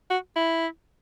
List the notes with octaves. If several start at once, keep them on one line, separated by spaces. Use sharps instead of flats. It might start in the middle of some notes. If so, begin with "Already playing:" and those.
F#4
E4